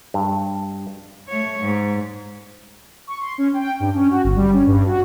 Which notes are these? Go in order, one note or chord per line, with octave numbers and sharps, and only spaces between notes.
G2
A3 C#5
G#2
C#6
C6
C#4
G5
G2
C#4
F#4
G1
G3
C#4
G2
F#4